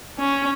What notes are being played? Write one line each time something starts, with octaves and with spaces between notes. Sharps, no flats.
C#4